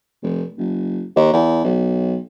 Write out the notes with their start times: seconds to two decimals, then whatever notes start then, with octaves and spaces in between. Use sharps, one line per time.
0.23 F1
0.58 F#1
1.16 D#2
1.33 E2
1.64 B1